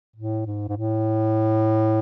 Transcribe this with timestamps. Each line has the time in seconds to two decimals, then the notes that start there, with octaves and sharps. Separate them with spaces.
0.16 A2
0.46 G#2
0.69 G#2
0.76 A2